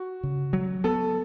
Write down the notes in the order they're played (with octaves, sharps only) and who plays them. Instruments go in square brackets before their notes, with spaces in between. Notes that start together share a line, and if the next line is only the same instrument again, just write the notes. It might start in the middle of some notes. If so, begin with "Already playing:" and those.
Already playing: [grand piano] F#4
[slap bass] C#3
F#3
[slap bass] B3 [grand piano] A4